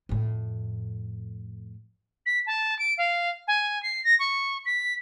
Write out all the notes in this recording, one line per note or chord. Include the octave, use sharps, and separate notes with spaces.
F2 A2
B6
A5
D7
F5
G#5
C7
A#6
C#6
B6